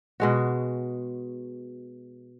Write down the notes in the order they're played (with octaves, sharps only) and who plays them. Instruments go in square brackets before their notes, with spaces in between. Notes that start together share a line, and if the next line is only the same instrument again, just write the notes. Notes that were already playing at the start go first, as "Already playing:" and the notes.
[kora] B2 G#3 F#4